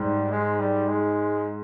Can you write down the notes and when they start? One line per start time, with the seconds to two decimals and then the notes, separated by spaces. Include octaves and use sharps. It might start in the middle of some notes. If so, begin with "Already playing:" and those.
Already playing: G#2 G3
0.31 G#3
0.59 G3
0.88 G#3